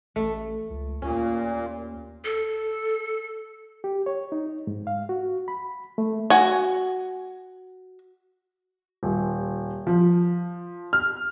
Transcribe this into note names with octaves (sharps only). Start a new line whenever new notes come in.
A1 A3
C#2
D#2 A#2 C#4
A4
G4
C#5
D#4
G#2
F5
F#4
B5
A3
F#4 G#5
D#1
F3
F6